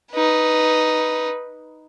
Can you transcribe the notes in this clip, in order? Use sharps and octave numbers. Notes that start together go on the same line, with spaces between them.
D#4 B4